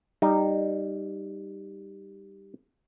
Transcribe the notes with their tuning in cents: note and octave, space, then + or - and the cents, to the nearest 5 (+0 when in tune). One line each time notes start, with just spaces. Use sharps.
G3 +0 D#4 -10